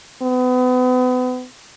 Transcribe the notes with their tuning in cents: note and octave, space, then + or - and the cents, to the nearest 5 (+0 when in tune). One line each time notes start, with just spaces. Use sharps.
B3 +35